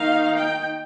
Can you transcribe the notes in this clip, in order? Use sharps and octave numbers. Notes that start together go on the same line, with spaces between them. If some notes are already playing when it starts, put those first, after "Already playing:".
Already playing: D#3 A#3 D#4 F5
G5